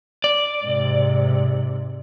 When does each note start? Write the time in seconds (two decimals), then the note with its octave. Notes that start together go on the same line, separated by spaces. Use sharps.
0.24 D5
0.64 G#2 C3